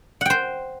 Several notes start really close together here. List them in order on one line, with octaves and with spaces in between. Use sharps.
F#5 G5 C5